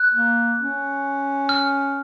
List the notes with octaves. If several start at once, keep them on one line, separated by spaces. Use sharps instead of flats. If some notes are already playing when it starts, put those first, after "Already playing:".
Already playing: F#6
A#3
C#4
F6